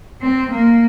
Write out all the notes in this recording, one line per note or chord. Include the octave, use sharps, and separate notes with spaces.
C4
A#3